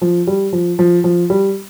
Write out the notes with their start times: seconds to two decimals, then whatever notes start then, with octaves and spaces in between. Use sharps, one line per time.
0.02 F3
0.27 G3
0.53 F3
0.79 F3
1.04 F3
1.30 G3